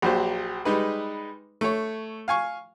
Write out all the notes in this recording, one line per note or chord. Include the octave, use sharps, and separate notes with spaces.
A#1 F#3 G4 C5
G3 G#3 D#4 B4
A3 C#5
F5 G#5 C#6